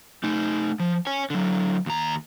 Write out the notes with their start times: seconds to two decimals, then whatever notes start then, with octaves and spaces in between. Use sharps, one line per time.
0.24 A3 D#4
0.80 F3
1.07 C#5 G#5
1.30 D3 F#3
1.86 D#2 A#5